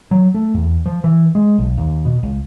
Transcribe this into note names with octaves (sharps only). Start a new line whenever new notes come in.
F#3
A3
E2
F3
E3
G#3
B1
D#2
B2
C#2